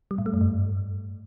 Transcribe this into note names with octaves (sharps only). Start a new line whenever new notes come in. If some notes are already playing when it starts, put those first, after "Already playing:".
G3
A2
A3
F#2
G2